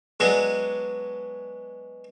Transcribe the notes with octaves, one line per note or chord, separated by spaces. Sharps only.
F#3 G#3 B3 D4 F#4